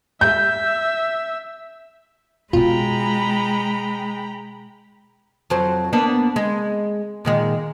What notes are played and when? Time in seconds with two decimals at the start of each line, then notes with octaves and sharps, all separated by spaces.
0.21 E5 G6
2.53 B2 G#3 C#4 F4 G5 A#5 B5
5.50 F2 F#3 C5
5.93 A#3 B3 D4
6.36 G#3
7.25 A#2 D#3 G#3